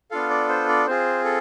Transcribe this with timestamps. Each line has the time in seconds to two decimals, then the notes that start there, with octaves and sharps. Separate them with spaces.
0.11 B3 D4 F4 A4 F5
0.30 D5
0.49 C5
0.69 D5
0.87 C4 F4 G#4 C5
1.24 A4